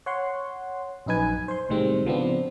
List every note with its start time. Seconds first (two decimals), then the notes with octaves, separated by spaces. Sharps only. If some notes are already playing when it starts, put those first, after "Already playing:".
0.06 C#5 F#5 C6
1.06 A#1 F#2 D#4 B4 G#5
1.48 C5 C6
1.69 C2 A2 D#3 G3 G#3 C4
2.05 C#3 F3 B3 C4 D4